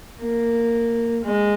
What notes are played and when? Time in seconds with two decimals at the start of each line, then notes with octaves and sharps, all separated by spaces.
0.20 A#3
1.24 G#3